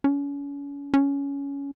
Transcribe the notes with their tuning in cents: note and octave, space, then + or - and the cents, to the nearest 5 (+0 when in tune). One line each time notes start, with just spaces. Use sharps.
C#4 +35
C#4 +15